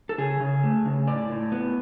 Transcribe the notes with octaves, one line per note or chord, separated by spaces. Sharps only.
A4
C#3 G#4
C#3
A3
C#3
A2 D5
A2
B3